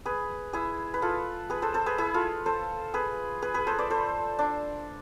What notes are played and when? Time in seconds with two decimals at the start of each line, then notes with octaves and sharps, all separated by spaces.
0.05 G#4 B4
0.53 E4 G#4
0.94 B4
1.02 F4 A4
1.50 G#4 B4
1.62 A4 C5
1.74 A4 C5
1.86 G#4 B4
1.98 E4 G#4
2.14 F4 A4
2.46 A4 C5
2.94 G#4 B4
3.42 G#4 B4
3.54 G#4 B4
3.67 A4 C5
3.78 B4 D5
3.90 A4 C5
4.39 D4